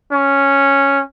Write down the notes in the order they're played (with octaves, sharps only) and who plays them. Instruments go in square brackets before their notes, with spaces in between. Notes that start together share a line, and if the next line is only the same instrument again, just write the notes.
[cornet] C#4